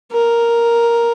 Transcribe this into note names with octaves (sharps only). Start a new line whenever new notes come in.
A#4